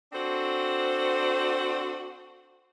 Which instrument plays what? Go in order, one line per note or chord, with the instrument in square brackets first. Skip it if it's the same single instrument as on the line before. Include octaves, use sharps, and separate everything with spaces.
[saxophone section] C4 D4 F#4 A4 C5